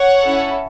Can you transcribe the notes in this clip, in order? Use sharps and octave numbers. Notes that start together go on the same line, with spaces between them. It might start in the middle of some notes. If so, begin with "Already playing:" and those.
Already playing: C#5 F#5
C#4 E4 A4